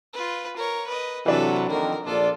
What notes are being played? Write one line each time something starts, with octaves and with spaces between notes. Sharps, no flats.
F4 B4
A#4 C#5
B4 D#5
C3 E3 F#3 D4 A4 B4
F2 D3 D#3 A#3 A#4
A#1 D4 F4 A4 D5